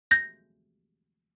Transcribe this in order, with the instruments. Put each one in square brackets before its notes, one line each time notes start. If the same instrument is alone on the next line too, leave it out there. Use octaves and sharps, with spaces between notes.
[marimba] G6 A#6